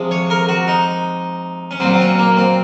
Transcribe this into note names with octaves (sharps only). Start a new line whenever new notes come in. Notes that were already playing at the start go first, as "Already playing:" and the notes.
Already playing: C3 F3 G#3
C#5
A#4
F#4
D#4
C#4
A#2 F#3 C4
C4
C#4
A#3
C4